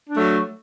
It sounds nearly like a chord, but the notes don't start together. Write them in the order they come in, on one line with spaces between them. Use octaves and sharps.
D4 A3 F#3